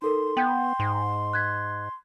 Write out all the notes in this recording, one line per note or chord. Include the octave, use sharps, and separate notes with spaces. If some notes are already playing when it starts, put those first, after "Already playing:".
D#4 A4 A#4 C6
B3 G5 G6
G#2
F#6 G#6 B6